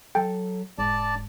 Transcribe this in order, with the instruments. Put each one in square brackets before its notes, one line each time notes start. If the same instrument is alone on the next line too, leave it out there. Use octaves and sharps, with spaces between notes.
[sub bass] F#3 [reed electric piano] A4 [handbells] G5
[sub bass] E1 [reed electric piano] G#2 [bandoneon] D5 A5